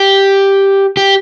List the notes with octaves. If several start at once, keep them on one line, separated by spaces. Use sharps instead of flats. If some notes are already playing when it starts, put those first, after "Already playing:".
Already playing: G4
G4